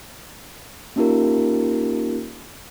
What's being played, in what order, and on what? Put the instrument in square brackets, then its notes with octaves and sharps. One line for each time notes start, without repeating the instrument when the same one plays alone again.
[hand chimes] A#3 C#4 D#4 F4 G4 A#4